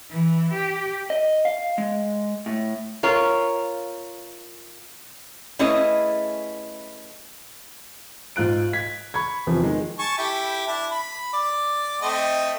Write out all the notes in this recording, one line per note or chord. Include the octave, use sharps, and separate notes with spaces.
E3
G4
D#5
F5
G#3
A2
F4 A#4 C#5
A3 C#4 E4 G#4 B4 D#5
G#2 F4 F#6 D7
G#6 B6
B5 C#6 G#6
E2 C3 F3
D#3 G#3
G#5 A5 C#6
E4 G4 A4
D4 E4
B5
D5
A3 C4 D#5